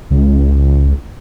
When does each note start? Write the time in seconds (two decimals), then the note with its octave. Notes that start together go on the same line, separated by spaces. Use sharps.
0.11 C#2